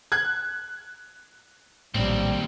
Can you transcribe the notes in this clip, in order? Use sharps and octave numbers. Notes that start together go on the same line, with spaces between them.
F#6 G#6
A#1 D#2 A2 G3 C4